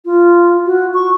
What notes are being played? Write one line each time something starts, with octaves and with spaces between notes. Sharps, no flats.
F4
F#4
C#6